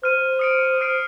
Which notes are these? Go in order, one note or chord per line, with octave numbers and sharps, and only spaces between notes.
C5 F6 D#7
D#6 C#7 D7
F6 C7 D7